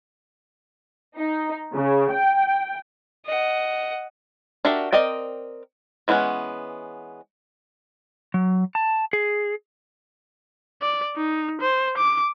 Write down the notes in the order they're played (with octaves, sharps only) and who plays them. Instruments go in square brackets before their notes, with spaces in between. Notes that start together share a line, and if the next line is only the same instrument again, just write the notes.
[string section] D#4
C#3
G5
[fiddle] D#5 F#5
[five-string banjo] D4 F#4 G4 A#4 E5
C4 A#4 D5 D#5 G5
E3 G#3 B3 C#4 F#5
[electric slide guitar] F#3
A5
G#4
[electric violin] D5
D#4
C5
D6